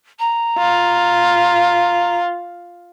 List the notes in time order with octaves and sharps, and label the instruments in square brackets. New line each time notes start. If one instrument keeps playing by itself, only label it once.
[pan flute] A#5
[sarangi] F4